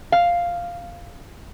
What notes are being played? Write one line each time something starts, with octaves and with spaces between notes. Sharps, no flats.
F5